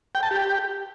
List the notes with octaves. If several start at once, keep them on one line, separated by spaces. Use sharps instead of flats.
G5
A5
G4